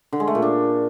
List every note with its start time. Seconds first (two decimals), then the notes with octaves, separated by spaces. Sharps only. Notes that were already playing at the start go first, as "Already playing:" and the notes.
0.12 D3
0.20 G#3
0.27 A3
0.35 A#2
0.42 D4